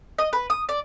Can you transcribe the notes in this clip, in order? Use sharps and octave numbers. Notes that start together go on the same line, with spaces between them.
D#5
B4
D#6
D5